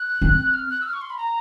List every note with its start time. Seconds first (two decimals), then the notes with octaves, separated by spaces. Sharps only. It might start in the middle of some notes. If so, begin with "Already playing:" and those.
Already playing: F#6
0.22 C4
0.53 F6
0.70 F#6
0.81 E6
0.86 F6
0.93 C#6
1.01 C6
1.10 B5
1.17 A#5